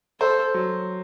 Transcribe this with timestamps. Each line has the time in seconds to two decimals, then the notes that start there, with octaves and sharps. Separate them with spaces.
0.20 A4 C5
0.54 F#3